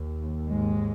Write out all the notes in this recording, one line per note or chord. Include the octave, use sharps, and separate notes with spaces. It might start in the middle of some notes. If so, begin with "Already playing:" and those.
Already playing: D#2
G#2 G#3